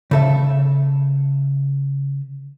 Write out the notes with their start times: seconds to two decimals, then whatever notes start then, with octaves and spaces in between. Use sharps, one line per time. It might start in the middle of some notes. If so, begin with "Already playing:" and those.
0.11 C#3 A4 E5